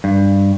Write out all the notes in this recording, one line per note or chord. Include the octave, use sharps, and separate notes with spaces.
G2